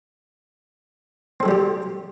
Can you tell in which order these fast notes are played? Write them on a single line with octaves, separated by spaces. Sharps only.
C4 A4 F#3 G3 G4